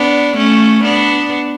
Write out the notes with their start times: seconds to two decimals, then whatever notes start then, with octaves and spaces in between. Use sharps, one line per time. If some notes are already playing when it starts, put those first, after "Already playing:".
Already playing: B3 D4
0.37 A3 C#4
0.84 B3 D4